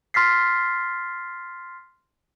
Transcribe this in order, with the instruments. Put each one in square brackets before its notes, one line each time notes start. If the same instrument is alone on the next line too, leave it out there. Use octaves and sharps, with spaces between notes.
[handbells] C6 F6 A6 B6 C7